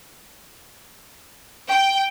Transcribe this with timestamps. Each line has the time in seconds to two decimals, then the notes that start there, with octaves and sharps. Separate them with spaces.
1.69 G5